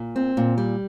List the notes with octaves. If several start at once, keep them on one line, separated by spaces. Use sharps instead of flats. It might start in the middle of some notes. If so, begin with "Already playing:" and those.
Already playing: A#2
C4
A#2
G3